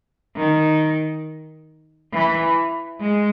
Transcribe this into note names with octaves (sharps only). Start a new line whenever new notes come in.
D#3
E3
G#3